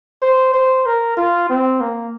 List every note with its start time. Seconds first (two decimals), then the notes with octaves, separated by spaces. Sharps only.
0.22 C5
0.54 C5
0.86 A#4
1.17 F4
1.49 C4
1.81 A#3